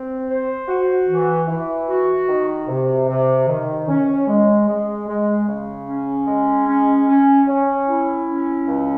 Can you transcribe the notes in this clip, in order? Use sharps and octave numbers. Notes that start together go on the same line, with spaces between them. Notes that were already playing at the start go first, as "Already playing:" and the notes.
Already playing: C4
C5
F#4
E3
E3
F#4
D#3
C3
C3
D#3
C#4
G#3
G#3
G#3
C#3
C#4
G#3
C#4
C#4
C#4
E4
C#4
C#2